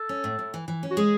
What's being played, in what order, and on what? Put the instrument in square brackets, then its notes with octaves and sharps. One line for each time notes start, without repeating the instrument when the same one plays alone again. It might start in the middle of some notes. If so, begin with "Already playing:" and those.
Already playing: [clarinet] A4
[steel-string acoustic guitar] C#4
A2
A2
E3
E3
C#4
[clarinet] F#4
[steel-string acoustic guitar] G#3 [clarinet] G#4